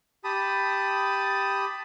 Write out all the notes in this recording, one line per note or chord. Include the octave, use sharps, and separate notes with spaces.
G4 A5 B5 D#6